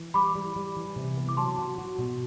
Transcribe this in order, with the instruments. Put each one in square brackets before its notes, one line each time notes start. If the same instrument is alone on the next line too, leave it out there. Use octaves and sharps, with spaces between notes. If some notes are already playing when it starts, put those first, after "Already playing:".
Already playing: [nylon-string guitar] E3
[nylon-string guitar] G3 [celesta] B5 D6
[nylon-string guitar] G3
G3
E3
C3
B3
[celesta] D6
[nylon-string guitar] F#3 [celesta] A5 C6
[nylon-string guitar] F#4
F#4
B2